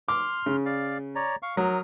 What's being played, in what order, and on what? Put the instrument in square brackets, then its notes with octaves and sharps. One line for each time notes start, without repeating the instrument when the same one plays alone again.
[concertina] C6 F6 [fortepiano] D6
[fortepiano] C#3
[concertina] D5 F5
C#5 D5 A#5
F5 C#6
[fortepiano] F#3 [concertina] A#4 D#6 F6